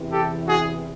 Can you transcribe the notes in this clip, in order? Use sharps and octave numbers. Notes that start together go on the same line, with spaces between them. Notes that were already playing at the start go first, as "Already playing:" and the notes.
Already playing: E2 C3 E3
G4 A4
F#4 G#4